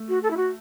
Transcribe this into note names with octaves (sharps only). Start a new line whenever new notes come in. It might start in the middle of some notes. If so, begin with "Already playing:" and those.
Already playing: A3
F#4
A4
E4
F#4